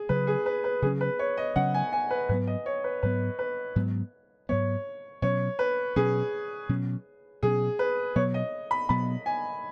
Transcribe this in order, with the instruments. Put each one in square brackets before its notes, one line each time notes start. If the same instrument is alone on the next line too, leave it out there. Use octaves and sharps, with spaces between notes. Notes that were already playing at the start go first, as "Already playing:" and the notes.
Already playing: [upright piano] G#4
[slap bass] C#3 F#3 C#4 [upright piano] B4
[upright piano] G#4
B4
B4
[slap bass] C#3 F#3 C#4 [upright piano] G#4
[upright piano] B4
C#5
D#5
[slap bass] C#3 F#3 C#4 [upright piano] F#5
[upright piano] G#5
G#5
B4
[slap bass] G#2 F#3 B3 [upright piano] B4
[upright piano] D#5
C#5
B4
[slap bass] G#2 F#3 B3 [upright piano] B4
[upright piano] B4
[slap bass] G#2 F#3 B3
[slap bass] G#2 F#3 B3 [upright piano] C#5
[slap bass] B2 F#3 C#4 [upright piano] C#5
[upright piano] B4
[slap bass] B2 F#3 C#4 [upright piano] G#4
[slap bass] B2 F#3 C#4
[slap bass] B2 F#3 C#4 [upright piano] G#4
[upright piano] B4
[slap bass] B2 F#3 B3 [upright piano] C#5
[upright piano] D#5
B5
[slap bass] B2 F#3 B3 [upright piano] B5
[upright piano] G#5